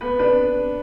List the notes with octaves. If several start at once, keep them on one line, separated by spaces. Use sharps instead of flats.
B3 B4
D4 B4